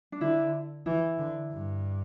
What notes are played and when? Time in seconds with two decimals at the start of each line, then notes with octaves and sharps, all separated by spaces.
0.12 D4
0.20 D3 E4
0.86 E3 E4
1.18 D3
1.51 G2